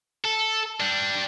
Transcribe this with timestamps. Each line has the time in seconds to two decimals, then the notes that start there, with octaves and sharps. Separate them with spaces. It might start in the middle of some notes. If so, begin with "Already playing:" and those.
0.25 A4
0.80 G3 D4